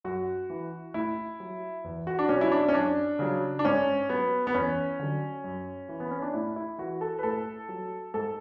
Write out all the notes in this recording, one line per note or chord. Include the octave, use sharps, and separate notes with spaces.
F#2 F#4
E3
A2 E4
F#3
E2
F#4
D4
B2 F#3 C#4
E4
D4
C#4
F#2 D4
C#3 F#3
D4
G#2 C#4
F#3 B3
B3
E2 C#4
D3 F#3
F#2
E3
B3
C#4
D4
A2 E4
E4
E3 F#4
A4
B4
A2 A4
F#3
G#2 A4